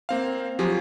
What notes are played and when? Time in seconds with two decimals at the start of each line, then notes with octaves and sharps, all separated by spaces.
0.09 A#3 C4 F5
0.59 F3 F#3 G4 G#4